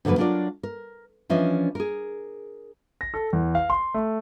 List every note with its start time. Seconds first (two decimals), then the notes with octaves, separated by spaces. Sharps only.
0.05 F2 D3 F#3 A#3 B4
0.18 F#3 D4 E4 F4 A#4 D5
0.63 A#4
1.30 E3 F3 C#4 D4 D#5 E5
1.75 G#4 A#4
3.01 A#6
3.14 A4
3.33 E2
3.55 F5
3.70 C6
3.94 A3